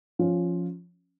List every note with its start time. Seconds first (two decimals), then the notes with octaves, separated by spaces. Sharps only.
0.19 F3 C#4 F4